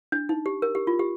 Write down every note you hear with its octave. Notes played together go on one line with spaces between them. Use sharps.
D4
D#4
G4
A#4
G4
F4
G4